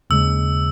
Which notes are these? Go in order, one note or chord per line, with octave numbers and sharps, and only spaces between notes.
D#2 C#3 G#3 E6